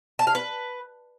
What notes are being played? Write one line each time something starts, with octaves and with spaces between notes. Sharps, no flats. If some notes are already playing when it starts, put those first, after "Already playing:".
A5
F5
B4